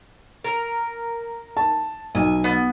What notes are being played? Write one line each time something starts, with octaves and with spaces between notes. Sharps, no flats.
A#4
A5
B1 G#5
B3